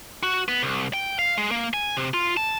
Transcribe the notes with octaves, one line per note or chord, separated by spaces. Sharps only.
F#4
B3
C2
G5
F5
G#3
A#3
G#5
C3
F4
A5